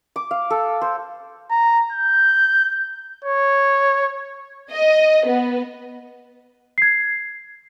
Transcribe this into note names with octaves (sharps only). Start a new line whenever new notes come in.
D6
F5
A4
C5
A#5
G6
C#5
D#5
B3
G#6 C7